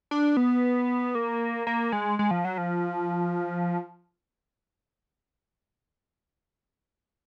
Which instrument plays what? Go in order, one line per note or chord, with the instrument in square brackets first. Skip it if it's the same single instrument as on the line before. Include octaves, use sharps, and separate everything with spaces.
[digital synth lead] D4
B3
A#3
A#3
G#3
G#3
F3
F#3
F3